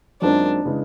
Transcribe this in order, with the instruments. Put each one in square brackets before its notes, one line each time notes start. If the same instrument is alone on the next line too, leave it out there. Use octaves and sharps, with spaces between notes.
[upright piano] F#2 D#3 G#3 C4 F4 [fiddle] D4
[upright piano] C#3 E3 G#3